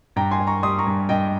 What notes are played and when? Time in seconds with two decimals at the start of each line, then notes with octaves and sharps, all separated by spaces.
0.16 G2 G5 A#5
0.31 G#5 C6
0.40 G2
0.47 A#5 C#6
0.63 G3 C6 D#6
0.79 A#5 C#6
0.86 G2
1.09 G2 D#5 G5